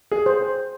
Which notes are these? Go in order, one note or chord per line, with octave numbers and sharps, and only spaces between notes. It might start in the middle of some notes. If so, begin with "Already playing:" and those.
G#4
C5